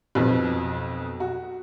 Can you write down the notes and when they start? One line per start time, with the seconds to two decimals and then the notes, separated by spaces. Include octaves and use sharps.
0.15 B1 F2 B2
1.20 F#4